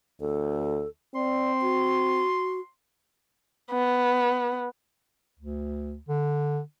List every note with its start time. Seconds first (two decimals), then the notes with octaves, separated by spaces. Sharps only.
0.21 D2 A4
1.15 C4 D5 C6
1.62 F#4
3.71 B3
5.39 D2
6.09 D3